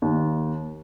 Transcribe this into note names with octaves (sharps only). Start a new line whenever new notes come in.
D#2